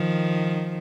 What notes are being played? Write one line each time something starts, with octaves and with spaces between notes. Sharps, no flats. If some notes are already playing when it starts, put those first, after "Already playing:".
Already playing: D#3 F3